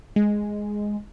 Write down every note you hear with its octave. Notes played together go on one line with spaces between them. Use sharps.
G#3